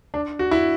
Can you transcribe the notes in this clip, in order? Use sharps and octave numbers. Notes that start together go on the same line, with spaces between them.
D4
F#4
E4